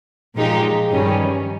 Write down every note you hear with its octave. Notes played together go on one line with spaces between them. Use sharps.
A#2 F3 G#3 D#4 G4
G2 D#3 G3 C#4